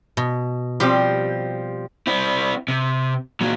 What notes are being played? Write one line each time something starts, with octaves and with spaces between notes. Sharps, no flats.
B2
F3 G3 C4 G4
C4 E4
C3
A#2 F#3